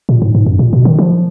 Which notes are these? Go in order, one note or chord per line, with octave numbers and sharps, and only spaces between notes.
A#2
G#2
G#2
F#2
A#2
B2
D#3
F3